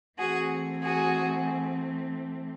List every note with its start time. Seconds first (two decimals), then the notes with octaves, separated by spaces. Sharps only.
0.18 E3 A3 C4 F#4 G#4
0.83 F#4 G#4